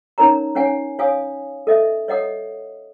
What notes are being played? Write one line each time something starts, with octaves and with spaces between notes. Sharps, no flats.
C#4 D#4 A#4 C#5 A#5
C#4 C#5 F#5 G#5
C#5 F5 G#5 D#6
A4 D#5 E5
C#5 D#5 F#5 D#6